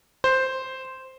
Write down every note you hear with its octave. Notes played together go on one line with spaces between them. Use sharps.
C5